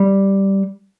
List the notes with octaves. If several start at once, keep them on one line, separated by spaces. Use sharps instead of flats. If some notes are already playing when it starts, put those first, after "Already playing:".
Already playing: G3